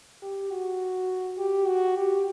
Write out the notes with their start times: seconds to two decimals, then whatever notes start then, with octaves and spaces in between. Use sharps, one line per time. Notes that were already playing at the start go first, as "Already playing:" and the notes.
0.22 G4
0.51 F#4
1.38 G4
1.67 F#4
1.96 G4